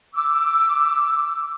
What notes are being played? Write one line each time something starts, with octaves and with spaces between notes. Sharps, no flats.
D6 E6